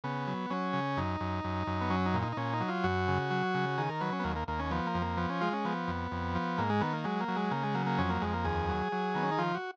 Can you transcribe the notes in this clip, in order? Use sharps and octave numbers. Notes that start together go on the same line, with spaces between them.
C#3 B3
F#3
F#3 C#4
C#3
F#2 D#4
F#2
F#2
F#2
B3
F#3 C#4
D#4
A#2
D#4
D#4
A#2 C#4
D#4
F#3
F4
F#2 F#4
C#3
F#3
C#3
D#3 G#4
A#4
F#3 B4
C#4
B3
D#2 A#3
A#3
D#2 A#3
C#4
F3 B3
A#3
F2
A#3
F3 B3
C#4
G#3 F4
C#4
F3 B3
F2
F2
F3
G#2 A#3
G#3
D#3 B3
A#3
F#3 G#3
A#3
F#3
G#3
C#3 A#3
G#3
F#3 A#3
A#3
F2 C#4
A#3
F2 G#3
A#3
D#2 G#4
F#3
F#3
D#3 B3
C#4
D#4
F3 F4
F#4